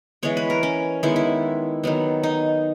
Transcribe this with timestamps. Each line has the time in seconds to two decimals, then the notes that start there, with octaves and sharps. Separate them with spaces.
0.23 E3 G#3 B3 C#5
0.37 B4
0.50 A#4
0.63 C#4
1.03 D#3 G#3 B3 E4
1.16 E4
1.84 D#3 F#3 B3
2.23 D#4